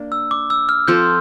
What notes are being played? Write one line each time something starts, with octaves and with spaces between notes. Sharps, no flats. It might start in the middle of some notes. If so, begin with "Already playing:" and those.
Already playing: A#3 D4
E6
D6
E6
F6
F3 C4 F4 A4 G6